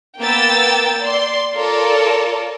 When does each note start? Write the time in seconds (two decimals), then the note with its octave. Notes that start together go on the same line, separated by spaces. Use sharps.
0.19 A#3 B3 G5 E6 A6
1.02 D5 C6
1.55 F4 A4 A#4 C#5 D5